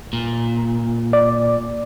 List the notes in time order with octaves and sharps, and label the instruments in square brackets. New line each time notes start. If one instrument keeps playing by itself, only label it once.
[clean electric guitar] A#2
[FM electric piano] D5